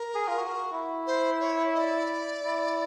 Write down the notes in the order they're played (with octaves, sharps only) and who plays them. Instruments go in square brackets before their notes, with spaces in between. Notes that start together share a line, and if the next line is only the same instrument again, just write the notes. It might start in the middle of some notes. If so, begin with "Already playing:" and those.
Already playing: [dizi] A#4
[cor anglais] G#4
F4
F#4
E4
[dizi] C5
C#5
D#5
D5
[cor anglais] E4